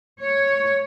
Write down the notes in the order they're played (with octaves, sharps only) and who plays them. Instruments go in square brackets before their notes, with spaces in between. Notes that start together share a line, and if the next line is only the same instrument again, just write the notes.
[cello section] C#5